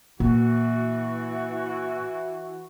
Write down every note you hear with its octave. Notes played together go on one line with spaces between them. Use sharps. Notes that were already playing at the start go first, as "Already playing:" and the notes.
A#2 E3 F#4